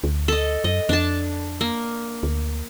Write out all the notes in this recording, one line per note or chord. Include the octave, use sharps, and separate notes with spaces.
D2
A4 D#5
F#2 D#5
F2 D4 A5
A#3
D2